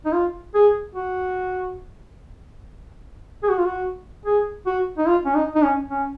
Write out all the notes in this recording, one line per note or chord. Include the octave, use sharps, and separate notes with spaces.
D#4
F4
G#4
F#4
G#4
F#4
F4
F#4
G#4
F#4
D#4
F4
C#4
D#4
D#4
C#4
C#4